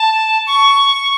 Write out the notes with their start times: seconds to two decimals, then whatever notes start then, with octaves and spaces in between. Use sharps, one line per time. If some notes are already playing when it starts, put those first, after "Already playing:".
Already playing: A5
0.47 C#6